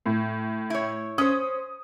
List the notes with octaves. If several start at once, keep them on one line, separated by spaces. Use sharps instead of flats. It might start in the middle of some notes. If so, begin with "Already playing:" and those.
A2
E4 C#5
C#4 C5 D#6